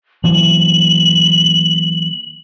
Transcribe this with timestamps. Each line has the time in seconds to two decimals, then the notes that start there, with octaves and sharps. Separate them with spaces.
0.24 E3 F#3 A#3 F#7